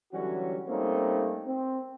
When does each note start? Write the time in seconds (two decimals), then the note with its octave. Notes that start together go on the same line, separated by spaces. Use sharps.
0.12 D3 E3 F#3 G3 C#4 F#4
0.68 G3 A3 A#3 C4 C#4 D#4
1.45 C4